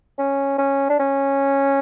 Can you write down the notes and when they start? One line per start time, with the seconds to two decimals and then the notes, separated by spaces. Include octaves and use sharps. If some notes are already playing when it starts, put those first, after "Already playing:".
0.18 C#4
0.58 C#4
0.89 D4
0.99 C#4